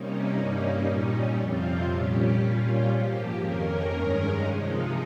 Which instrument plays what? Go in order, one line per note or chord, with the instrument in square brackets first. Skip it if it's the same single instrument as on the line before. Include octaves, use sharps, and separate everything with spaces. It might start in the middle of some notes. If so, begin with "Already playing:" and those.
Already playing: [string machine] C3 G3 A#3 C#4 D#4
G2 G3 A#3 C#4
A#2 G3 C#4
F2 C3 F3 C4 F4
A#2 G3 C#4 G4
A#2 G3 C#4 F4
G#2 F3 A#3 G4
F2 D#3 A#3 C#4 A#4
G2 D#3 G#3 C#4
C3 F3 G#3 D#4